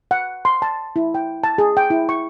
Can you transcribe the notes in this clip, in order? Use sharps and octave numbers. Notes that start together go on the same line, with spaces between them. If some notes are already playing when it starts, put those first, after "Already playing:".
F#5
C6
A5
E4
G5
A5
G#4
G5
E4
C#6